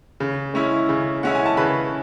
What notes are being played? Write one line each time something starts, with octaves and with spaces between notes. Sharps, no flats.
C#3
G#3 C#4 E4
C#3
G#3 C#4 E4 F#5
G#5
A5
C#3 B4 B5